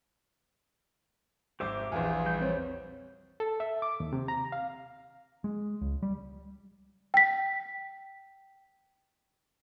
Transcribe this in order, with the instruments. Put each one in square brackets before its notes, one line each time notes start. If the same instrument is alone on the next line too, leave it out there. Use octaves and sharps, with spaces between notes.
[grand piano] G#1 C5 [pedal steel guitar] G4 E5 D6
[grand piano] A#1 E2 [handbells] B4 F5 G#5
[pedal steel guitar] G3 G6
[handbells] C4 C5 C#5
[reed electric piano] A4
E5
D6
D#2
C3
A#5
F5
[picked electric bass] G#3
C#2
G3
[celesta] G5 B6